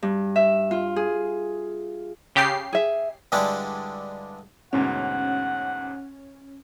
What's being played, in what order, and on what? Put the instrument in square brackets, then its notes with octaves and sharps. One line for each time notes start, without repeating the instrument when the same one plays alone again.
[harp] G2
E5
F4
G#4
[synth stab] C#3 G4 C7
[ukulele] G#4 E5
[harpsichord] G2 D3 G#3 D4 E4 G4
[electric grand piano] D2 G#2 B2 [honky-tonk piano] C#4 [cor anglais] F#5